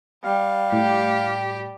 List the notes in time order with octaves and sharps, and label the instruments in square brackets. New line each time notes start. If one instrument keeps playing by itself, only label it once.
[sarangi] G3 [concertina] F5
[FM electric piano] A2 [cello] G4